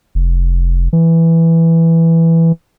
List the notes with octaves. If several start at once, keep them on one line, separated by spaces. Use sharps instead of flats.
F1
E3